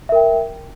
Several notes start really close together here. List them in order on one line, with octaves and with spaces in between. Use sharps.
E5 A#4 G5